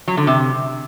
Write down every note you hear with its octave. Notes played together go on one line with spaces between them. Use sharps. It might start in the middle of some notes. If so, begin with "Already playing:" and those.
F#3
D3
C3